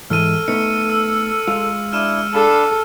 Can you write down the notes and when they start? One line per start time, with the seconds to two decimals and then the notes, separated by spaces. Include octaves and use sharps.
0.10 G#2 E3 G#3 A4 F6 D#7
0.48 A3 B3 D#4 C#7
0.90 E6
1.48 G#3 F4
1.93 D4 E4 F6 D#7 E7
2.34 D4 A4 F5 B5